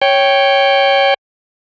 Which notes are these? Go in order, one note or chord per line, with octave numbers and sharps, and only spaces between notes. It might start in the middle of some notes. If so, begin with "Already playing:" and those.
C#5 G5